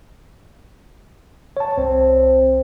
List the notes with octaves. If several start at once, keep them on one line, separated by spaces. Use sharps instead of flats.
C#5 A5
C2 C4